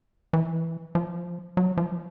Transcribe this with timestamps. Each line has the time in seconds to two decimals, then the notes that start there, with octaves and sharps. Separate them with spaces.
0.33 E3
0.95 F3
1.57 F#3
1.77 F3